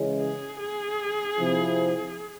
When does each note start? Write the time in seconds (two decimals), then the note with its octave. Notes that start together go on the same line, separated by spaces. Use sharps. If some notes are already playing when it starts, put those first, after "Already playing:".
Already playing: C#3 E3 G#3 C#4
0.21 G#4
0.60 G#4
1.38 C3 F3 C4 E4